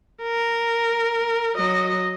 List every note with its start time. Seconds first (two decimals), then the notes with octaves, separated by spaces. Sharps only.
0.23 A#4
1.56 F#3 D#5